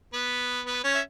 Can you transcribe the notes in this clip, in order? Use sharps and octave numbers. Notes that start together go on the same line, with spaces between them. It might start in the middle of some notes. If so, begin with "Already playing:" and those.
B3 B4
B3 B4
C#4 C#5
E5